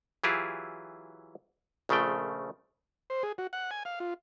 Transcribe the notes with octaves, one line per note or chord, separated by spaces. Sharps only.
E3 F#3 E4 F4 G4 G#4
A#1 C#3 F3 A3 G5
C5
G#4
F#4
F#5
G#5
F5
F4